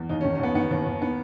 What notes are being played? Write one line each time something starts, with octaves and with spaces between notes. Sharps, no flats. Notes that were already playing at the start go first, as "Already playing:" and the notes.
Already playing: E2
D#2 D#4
C#4
D#3
C#4
D#2 B3
D#3 B3
D#2
D#2
D#3 B3